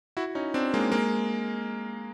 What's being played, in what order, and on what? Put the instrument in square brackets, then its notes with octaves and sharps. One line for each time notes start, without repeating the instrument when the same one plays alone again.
[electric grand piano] E4 F#4
C#4 D#4
C4 D4
G#3 A#3
G#3 A#3